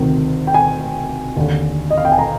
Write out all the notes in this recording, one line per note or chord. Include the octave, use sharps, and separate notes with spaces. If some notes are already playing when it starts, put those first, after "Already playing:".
Already playing: D2 C3 D#3
G5
G#5
D#2 D3
D#5
F5
G5
G#5
A#5